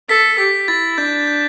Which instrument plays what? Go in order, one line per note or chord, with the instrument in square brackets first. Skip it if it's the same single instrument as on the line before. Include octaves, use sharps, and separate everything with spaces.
[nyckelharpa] A4 [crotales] B6
[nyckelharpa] G4 [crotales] B6
[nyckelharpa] E4 [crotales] A6
[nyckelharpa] D4 [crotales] G6
[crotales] G6